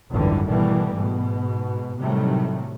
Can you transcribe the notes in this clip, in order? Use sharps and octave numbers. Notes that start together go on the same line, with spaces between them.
G#1 C#2 F#2 D3 E3 G3
B2 D#3 E3 G3 A3
G#2 B2
A2 C3 D#3 F#3 G3 A3